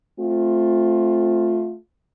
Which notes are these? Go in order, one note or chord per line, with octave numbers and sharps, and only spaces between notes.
A3 C4 F4